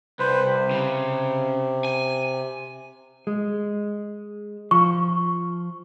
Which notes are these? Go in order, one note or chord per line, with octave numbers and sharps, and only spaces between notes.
C2 B4 C5
C3
C#3
G#5
G#3
F3 C#6